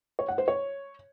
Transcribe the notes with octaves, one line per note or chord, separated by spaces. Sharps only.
C#5
F#5
C5
C#5